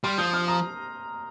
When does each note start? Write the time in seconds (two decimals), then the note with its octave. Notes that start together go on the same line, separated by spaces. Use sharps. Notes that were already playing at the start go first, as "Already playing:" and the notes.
0.04 G3 C6 F6
0.18 F3 D#6 G6
0.33 C6 F6
0.47 A#5 D#6